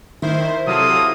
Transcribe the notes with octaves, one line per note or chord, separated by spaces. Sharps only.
D#3 E4 C5
C3 F#3 A#3 F4 A4 D#6